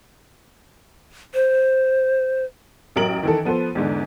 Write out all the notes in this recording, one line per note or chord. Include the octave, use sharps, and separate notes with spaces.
C5
A1 F#3 A#4 D7 F#7
D#3 E3 A4
F3 B3 A4 C5
E2 G#2 D3